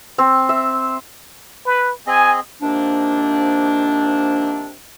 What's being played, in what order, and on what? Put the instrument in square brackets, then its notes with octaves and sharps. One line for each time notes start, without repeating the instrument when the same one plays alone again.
[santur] C4
E5
[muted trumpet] B4
[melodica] C4 G#4 D#5 [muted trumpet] G#5
[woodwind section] C3 D#3 F3 A#3 D4